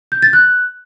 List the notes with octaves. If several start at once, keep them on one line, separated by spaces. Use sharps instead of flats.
G6
A6
F#6